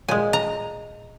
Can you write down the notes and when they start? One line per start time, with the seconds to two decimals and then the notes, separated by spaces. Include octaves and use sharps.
0.08 A#2 G#3 G#5
0.33 A#5